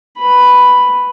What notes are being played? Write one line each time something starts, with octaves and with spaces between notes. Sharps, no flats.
B4 B5